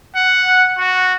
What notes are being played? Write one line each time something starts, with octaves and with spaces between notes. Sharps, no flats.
F#5
F#4